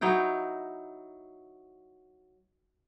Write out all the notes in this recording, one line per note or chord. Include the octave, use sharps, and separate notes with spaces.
F#3 D#4 E4 G5